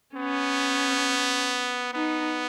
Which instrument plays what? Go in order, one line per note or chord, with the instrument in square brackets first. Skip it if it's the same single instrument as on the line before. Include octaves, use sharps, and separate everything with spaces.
[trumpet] B3 [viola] C#4
[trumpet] B3 [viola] D#4